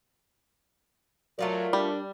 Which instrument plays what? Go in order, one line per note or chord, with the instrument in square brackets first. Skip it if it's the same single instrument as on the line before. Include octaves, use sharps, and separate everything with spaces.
[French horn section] F#3 [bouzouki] A3 F4 D5 [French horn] A#4
[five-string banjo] G3 [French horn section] D4